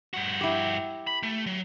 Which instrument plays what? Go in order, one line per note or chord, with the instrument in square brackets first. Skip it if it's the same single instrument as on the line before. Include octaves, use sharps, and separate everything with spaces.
[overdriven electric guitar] G2 F#4
[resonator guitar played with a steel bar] E4 G4
[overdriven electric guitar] B5
A3
F#3